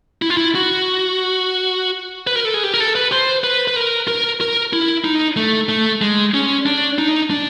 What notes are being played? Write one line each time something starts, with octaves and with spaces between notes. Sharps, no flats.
E4
F4
E4
F#4
B4
A#4
A4
G#4
G4
A#4
A4
B4
C5
B4
B4
A#4
A#4
A#4
E4
D#4
A3
A3
G#3
C#4
D4
D#4
D4